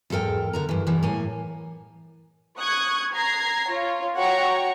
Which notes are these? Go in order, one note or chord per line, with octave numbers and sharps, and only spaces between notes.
E2 G#2 A4 A#4 G5
D3 A#4 A#5
G2 E3
G2 B2 E3 F3
A2 A#3 G#5
C#6 D#6 F#6 G#6
A#5 G#6 A#6 C7
F4 C#5
F#4 C#5 F#5 G5 A#5 C#6